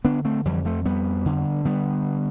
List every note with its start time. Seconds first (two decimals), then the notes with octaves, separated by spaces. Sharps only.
0.04 D3 B3 D4
0.25 A3 C4
0.45 F2 E3 G3
0.65 F3 A3
0.85 F2 G3 B3
1.26 D3
1.65 D3 G3 B3